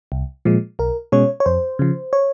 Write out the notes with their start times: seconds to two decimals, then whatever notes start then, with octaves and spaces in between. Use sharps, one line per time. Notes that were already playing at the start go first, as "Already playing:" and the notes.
0.12 C2
0.45 A#2 F3 G#3
0.79 B1 A#4
1.12 B2 G#3 C#4 C#5
1.40 C#5
1.46 F2 C5
1.79 C#3 F3
2.13 C#5